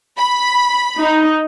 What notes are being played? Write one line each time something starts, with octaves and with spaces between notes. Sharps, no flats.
B5
D#4